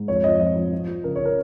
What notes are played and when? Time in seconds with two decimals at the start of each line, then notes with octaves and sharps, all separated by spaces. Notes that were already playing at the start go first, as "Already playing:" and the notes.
Already playing: G#2
0.08 F2 C#5
0.24 F2 D#5
0.40 F3 D#5
0.56 F3
0.73 F3
0.88 F3
1.04 C#3 A#4
1.15 C#5
1.20 C#3
1.25 A#4